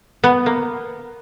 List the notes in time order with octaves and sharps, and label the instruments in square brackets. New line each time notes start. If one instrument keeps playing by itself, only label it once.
[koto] B3
A#3